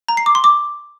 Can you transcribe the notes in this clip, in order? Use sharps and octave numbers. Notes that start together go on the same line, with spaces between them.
A#5
C7
D6
C6
D6